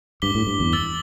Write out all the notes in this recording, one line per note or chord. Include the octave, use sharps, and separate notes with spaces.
G2 D6 B6 G7
A2
G2
E2
E6 A6 G7